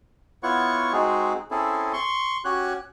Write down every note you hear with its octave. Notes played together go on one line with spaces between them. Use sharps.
B3 E4 F4 C#5 F#5 C#6
G#3 C4 D#4 F#4 G#4
C4 C#4 E4 G#4 A4
C6 C#6
C#4 F#4 G4 C#5 F#6